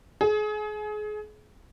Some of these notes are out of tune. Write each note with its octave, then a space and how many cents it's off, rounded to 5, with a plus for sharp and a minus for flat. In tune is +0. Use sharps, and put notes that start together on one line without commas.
G#4 +30